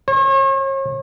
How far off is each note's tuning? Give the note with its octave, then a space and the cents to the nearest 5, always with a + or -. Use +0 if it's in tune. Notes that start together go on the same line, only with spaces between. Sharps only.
C#5 -40